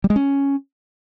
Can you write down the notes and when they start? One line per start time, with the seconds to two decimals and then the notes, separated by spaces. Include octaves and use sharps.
0.04 G3
0.10 G#3
0.16 C#4